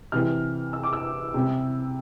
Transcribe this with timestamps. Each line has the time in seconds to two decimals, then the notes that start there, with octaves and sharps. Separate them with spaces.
0.12 C3 E3 G3 F6
0.73 E6
0.83 D6
0.93 E6
1.34 C3 G3